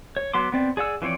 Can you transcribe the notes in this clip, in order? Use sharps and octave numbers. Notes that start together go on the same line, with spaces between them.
C#5
F#3 B3 C6 D6
B3 C4 D5
G#4 D5 F#5 E6
E3 F3 C4 C#5 D5